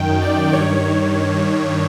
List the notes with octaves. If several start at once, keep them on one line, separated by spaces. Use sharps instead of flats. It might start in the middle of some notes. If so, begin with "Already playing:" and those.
Already playing: F#2 D#3 G5
D5
G2 D#3 C#5